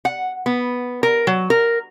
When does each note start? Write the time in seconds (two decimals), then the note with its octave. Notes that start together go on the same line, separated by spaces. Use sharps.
0.05 F#5
0.46 B3
1.03 A#4
1.27 F#3
1.50 A#4